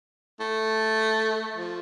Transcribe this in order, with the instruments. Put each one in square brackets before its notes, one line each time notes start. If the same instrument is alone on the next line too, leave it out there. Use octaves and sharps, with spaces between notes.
[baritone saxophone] A3
F3